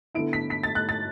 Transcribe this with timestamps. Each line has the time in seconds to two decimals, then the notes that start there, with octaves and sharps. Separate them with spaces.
0.15 D3 B3 E4 D7
0.33 B6
0.50 B6
0.63 A6
0.75 F#6
0.89 A6